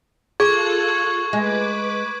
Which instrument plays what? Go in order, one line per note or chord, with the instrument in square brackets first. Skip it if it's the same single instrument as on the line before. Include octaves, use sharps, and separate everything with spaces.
[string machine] F4 A4 F#6 [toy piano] G#4 [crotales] C#6 G#6
[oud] G#3 [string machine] B4 D6